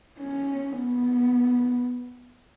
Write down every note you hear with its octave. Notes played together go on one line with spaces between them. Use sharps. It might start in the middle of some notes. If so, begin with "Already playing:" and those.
C#4
B3